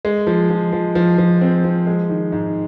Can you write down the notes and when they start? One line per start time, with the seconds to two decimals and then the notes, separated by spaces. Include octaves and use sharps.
0.05 G#3
0.27 F3
0.50 F3
0.72 F3
0.95 F3
1.18 F3
1.41 C4
1.64 F3
1.87 G#3
2.09 D#3
2.32 G#2